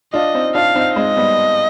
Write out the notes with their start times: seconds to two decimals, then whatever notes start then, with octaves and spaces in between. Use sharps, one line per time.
0.13 D4 F4 D#5
0.34 C4 D#4
0.55 D4 F4 F5
0.76 C4 D#4
0.96 G#3 C4 D#5
1.16 G3 B3